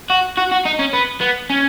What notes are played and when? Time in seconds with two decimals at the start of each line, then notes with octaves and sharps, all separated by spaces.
0.10 F#4
0.37 F#4
0.51 F#4
0.65 D#4
0.79 C#4
0.93 B3
1.21 B3
1.50 C#4